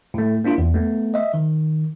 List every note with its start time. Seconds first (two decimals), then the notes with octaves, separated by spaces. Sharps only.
0.14 A2 A3
0.44 A#3 D4 E4 F4
0.58 E2
0.74 A3 B3
1.14 D#5 E5
1.34 D#3